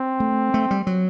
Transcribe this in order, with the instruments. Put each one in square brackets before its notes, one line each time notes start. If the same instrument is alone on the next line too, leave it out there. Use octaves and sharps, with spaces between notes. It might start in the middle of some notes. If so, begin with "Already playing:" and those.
Already playing: [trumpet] C4
[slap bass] A3
A3
G3
F#3